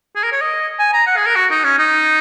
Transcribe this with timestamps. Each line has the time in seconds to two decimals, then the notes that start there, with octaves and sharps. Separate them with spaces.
0.16 G#4
0.24 A#4
0.32 C#5
0.41 D#5
0.79 G#5
0.94 A#5
1.07 F#5
1.17 G#4
1.26 A#4
1.36 F#4
1.51 D#4
1.64 C#4
1.79 D#4